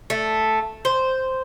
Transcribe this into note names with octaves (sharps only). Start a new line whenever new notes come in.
A3
C5